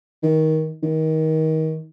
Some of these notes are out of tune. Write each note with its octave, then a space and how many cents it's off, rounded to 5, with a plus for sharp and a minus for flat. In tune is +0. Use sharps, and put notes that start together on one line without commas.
D#3 +20
D#3 +25